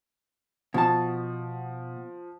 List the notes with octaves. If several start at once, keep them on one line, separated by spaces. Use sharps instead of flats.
B2 F3 A5